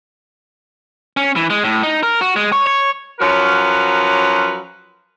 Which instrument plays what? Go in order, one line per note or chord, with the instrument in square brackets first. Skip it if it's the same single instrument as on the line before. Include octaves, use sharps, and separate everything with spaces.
[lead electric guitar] C#4
E3
G#3
A2
D#4
A#4
F#4
G#3
C#5
C#5
[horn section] F3 F#3 C#4 F#4 A#4 B4